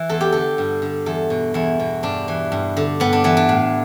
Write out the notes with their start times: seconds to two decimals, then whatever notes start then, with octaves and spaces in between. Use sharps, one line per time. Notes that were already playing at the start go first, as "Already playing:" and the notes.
Already playing: E3
0.09 E2 A4
0.21 G4
0.32 D3 A4
0.58 G2
0.82 D3
1.06 E2 A4
1.30 B2
1.54 E2 E4
1.80 B2
2.03 G2 D4
2.28 E3
2.52 G2
2.77 D3
3.00 G2 B3
3.13 D4
3.24 E3 B3
3.37 D4
3.49 A2